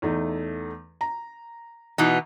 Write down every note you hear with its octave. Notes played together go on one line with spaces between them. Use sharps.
E2 A3 D#4
A#5
B2 E3 D#4